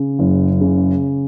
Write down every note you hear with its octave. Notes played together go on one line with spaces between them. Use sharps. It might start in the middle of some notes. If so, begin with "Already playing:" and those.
Already playing: C#3
F#1
C#3